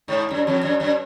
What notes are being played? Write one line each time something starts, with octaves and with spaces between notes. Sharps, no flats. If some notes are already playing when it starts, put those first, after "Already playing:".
G#2
F#2
F2
F#2
F#2